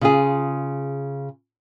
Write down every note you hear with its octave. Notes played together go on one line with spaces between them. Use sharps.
C#3 F4 G#4